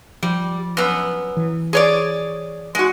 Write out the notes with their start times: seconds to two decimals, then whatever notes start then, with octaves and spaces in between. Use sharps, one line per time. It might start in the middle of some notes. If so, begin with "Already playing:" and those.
0.23 F3 G3
0.77 F#2 B3
1.37 E3
1.73 G#4 C#5 D5
2.75 G#3 F#4